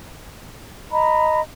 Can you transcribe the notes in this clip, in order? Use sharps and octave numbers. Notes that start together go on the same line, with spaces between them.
D#5 A#5 B5